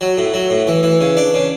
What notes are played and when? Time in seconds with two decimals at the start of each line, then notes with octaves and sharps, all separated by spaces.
0.01 F#3
0.18 A2
0.34 F#3
0.50 A2
0.67 E3
0.83 E3
1.01 C#3
1.17 D4
1.34 C#3